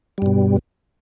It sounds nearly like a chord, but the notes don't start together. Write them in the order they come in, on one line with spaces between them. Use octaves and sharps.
G3 G2 B2